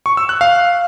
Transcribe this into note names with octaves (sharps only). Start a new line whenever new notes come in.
C#6
E6
F#6
F5